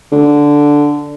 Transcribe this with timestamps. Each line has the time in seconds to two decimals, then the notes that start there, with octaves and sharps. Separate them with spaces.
0.12 D3